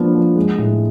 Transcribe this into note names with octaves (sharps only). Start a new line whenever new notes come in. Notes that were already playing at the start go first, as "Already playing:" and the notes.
Already playing: F3 A#3 B3 D4
F3
G#3
A2